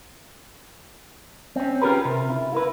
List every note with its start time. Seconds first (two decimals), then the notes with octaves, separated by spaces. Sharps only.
1.56 C4 C#4
1.82 C#4 F4 G4 G#4 A#4 B4
2.05 C3
2.30 E4
2.52 E4 A#4 B4